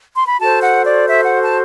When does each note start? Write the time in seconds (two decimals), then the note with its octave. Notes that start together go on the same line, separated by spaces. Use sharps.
0.15 C6
0.27 B5
0.40 F#4 A4 C5 A5
0.62 F#5
0.85 D5
1.08 E5
1.24 F#5
1.41 A5